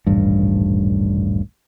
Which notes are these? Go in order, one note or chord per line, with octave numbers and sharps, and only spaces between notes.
D#1 A1 G2